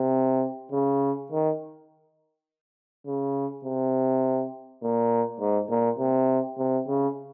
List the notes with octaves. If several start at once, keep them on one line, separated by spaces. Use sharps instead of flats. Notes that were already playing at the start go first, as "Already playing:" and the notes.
Already playing: C3
C#3
D#3
C#3
C3
A#2
G#2
A#2
C3
C3
C#3